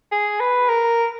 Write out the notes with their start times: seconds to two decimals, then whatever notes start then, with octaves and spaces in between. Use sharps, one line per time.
0.12 G#4
0.40 B4
0.69 A#4